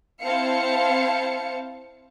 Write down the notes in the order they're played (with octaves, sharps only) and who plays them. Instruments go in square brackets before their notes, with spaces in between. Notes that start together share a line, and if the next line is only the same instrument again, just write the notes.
[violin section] C4 E4 C5 F5 A5 C#7